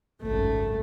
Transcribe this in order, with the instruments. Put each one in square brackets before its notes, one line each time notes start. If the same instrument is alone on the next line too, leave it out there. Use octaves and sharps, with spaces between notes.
[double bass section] G#1 C#2 F#2 [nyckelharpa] A3